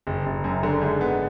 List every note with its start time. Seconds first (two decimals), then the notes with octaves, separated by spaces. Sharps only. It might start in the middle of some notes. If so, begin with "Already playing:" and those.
0.07 F#1
0.26 F#1
0.44 F#2
0.63 D3
0.81 G#2
1.01 B3